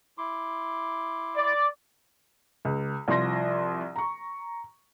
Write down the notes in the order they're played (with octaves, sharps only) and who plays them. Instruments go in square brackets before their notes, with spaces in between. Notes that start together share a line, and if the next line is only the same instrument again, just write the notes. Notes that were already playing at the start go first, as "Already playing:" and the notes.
[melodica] E4 C6 D6
[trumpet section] D5
[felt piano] C#2
C2 F3 C6 A#6
A#5 C#6